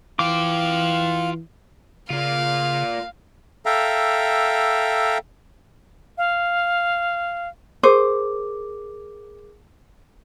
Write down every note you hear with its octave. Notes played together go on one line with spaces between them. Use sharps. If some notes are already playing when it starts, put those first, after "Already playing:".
E3 F4 F5 G5 D6
C#3 A#3 F4 F5
A4 E5 F5 G5 A#5
F5
G#4 A#4 C5 D6